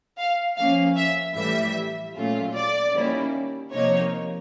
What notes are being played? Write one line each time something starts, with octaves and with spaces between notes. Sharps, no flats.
F5
F3 A#3 C#4 F5
E5
A2 E3 G3 E5
A#2 F#3 A3 C#4 F4
D5
D#3 G3 A#3 C#4 E4
C3 F3 A#3 D#4 C#5